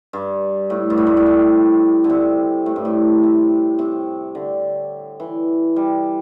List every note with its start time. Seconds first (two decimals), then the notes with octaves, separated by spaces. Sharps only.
0.13 G2
0.70 A2
0.90 G2
0.98 A2
1.07 G2
1.17 A2
1.26 C3
2.04 D3
2.10 C3
2.66 A2
2.76 G2
2.85 A2
3.23 C3
3.79 C3
4.35 D3
5.20 E3
5.76 G3